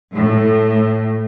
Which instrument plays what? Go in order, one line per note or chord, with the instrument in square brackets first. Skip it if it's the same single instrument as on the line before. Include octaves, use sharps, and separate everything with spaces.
[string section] A2